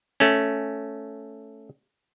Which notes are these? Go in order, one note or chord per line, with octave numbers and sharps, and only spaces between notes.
A3 C#4